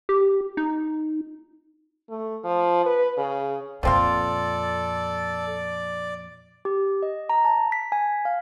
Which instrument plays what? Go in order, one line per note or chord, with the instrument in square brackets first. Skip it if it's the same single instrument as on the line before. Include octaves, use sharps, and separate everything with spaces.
[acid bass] G4
D#4
[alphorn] A3
F3
B4
C#3
[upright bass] F2 A#2 [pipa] F3 C4 F4 [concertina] A4 [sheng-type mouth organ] D5
[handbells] G4
D#5
A#5
A5
B6
G#5
F5